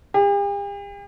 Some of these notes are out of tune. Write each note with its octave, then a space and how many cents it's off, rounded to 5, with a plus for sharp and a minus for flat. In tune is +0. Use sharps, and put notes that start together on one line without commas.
G4 +45